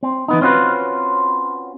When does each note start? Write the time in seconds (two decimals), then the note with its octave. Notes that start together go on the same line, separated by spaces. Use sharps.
0.03 C4
0.28 E3 B3 D#4
0.41 C4 C#4 F4 F#4 B4